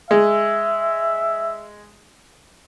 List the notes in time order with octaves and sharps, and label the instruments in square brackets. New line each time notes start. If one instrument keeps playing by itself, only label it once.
[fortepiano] G#3 [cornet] E5